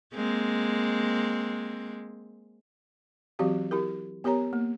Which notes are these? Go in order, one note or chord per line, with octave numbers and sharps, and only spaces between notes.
G#3 A#3 C4
E3 F#3 C4 F#4 G4 F5
E4 G4 A#4
B3 G4 A#4 C#5 A#5
A#3